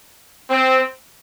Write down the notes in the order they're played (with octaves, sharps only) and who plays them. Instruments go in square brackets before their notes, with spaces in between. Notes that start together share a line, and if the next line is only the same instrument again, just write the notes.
[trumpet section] C4